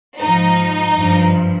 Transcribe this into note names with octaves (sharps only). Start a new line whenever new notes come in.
G#2 F3 D#4
G2 F3